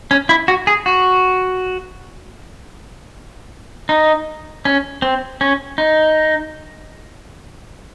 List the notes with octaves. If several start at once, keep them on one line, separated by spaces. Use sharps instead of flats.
C#4
E4
F#4
G#4
F#4
D#4
C#4
C4
C#4
D#4